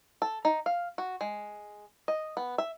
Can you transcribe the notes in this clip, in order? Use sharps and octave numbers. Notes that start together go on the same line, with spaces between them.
A4
D#4
F5
F#4
G#3
D#5
B3
E5